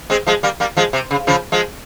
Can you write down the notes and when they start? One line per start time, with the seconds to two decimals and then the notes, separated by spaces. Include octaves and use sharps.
0.10 G#3 C4
0.27 F3 G#3
0.43 G3 A#3
0.60 G3 A#3
0.77 F3 G#3
0.93 C3
1.11 C#3
1.27 C#3 F3
1.52 F3 G#3